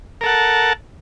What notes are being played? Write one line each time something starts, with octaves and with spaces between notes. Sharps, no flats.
A4 A#4 F#5 A5